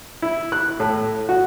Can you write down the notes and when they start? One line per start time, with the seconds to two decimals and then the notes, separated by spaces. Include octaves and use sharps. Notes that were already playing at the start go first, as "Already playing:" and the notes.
0.22 E4
0.52 F#6
0.80 A2
1.29 F#4